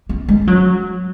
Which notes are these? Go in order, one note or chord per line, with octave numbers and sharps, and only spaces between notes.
B3
G#3
F#3